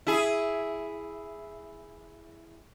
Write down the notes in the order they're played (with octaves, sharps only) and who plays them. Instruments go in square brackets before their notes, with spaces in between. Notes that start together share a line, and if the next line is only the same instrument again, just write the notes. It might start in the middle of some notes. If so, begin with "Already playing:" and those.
[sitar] E4 G#4